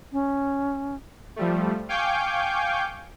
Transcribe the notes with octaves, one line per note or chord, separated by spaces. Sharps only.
C#4
F3 G3 A3
F5 G5 G#5 C#6 D6 G6